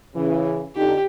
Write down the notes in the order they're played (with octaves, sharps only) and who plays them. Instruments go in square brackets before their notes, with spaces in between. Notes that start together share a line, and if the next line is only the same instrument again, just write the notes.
[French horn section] C#3 E3
[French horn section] F2 D3 D#4 [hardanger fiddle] G4